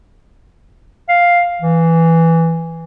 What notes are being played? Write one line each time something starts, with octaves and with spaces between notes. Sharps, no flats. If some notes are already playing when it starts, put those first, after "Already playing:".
F5
E3